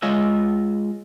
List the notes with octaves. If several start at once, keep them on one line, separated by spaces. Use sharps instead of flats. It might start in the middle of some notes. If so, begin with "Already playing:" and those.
G#3 F4 C#5 D#5 E5